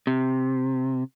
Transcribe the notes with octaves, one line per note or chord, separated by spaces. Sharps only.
C3